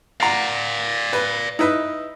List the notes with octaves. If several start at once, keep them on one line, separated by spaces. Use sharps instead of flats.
D5 F5 F#5 A#5
B4
D#4 E4 B4